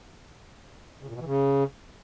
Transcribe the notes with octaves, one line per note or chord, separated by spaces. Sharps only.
C#3
A#2
B2
E3
C#3